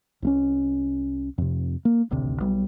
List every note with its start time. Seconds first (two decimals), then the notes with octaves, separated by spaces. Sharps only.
0.22 C2 A3 C#4
1.38 F2 C3
1.85 A#3
2.11 D#1 A1 D2 C3
2.40 B1 G3